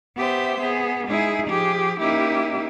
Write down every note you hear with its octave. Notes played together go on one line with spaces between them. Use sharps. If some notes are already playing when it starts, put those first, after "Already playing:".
B3 G4 C5 E5
B3 G#4
G#3 D#4 E4 G#4
F3 G4 G#4
A#3 C#4 D#4 E4 G4